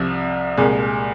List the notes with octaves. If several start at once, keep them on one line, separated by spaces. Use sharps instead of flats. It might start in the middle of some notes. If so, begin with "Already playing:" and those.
Already playing: C2 C3 F3
C2 A#2 G#3